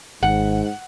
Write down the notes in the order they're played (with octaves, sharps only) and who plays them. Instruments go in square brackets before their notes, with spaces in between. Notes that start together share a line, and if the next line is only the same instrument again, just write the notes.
[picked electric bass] G#1 [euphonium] G#2 [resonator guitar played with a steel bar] F#5